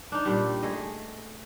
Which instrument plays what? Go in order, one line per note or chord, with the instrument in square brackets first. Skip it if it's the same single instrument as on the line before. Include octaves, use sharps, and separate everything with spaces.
[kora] D4 D#4
A#2 G3
A3 G#4 D#5